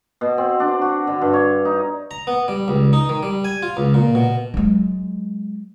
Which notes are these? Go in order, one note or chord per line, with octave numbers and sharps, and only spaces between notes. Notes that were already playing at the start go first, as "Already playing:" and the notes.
B2
C4
D4
F#4
D3
G2
C#5
D#4
A#5
B3
G3
C#2
D#4
D#3
G3
G#5
F4
C#2
A#2
B2
F#3 G#3